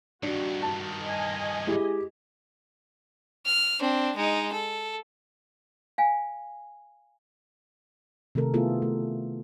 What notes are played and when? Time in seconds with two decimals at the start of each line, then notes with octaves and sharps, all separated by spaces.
0.23 G2 D#3 D4 F#4
0.62 A5
1.02 D#5 G#5
1.67 G#3 E4 G4
3.46 F6
3.81 C4 D4
4.16 G#3 D#4
4.52 A4
5.98 F5 G#5
8.35 C3 D#3 A3 A4 A#4
8.54 A3 B3 E4 F4 G#4 A4
8.82 A3